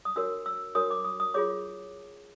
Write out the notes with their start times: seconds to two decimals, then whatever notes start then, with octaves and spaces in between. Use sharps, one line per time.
0.05 D#6
0.16 D4 F#4 A#4 C#5 E6
0.46 E6
0.75 D4 F#4 A#4 C#5 D#6
0.91 D6
1.05 D#6
1.20 D#6
1.34 F4 G#4 C#5 D6